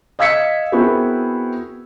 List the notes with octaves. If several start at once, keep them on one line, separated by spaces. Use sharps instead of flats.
D#5 F5 E6 G#6 B6 C#7
B3 C4 E4 F#4 G#4 A#4